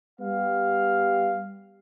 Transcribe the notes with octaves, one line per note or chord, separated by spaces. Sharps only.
G3 B3 G4 F5